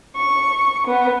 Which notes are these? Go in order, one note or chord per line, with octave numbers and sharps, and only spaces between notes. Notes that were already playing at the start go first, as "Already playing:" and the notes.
C#6
B3